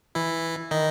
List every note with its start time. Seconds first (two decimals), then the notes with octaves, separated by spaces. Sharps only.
0.15 E3 E4
0.71 D#3 D#4